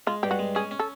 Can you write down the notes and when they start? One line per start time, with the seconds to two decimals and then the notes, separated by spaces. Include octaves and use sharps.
0.07 G#3 F4
0.23 G2 G4
0.31 F#4
0.39 G#3
0.55 C#4 G#4
0.71 C#4
0.79 A4